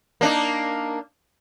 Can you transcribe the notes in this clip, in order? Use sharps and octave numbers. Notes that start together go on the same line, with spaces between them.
A#3 D4 D#4